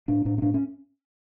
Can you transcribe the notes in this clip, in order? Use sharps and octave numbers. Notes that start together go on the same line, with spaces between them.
A2 D4
A2 D4
C#4
A2 D4
C#4